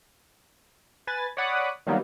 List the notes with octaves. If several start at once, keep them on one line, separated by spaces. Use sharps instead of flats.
B4 G#5 A6
C#5 D5 F#5 B5 D6 D#6
D#3 F#3 G3 A#3 B3 D#4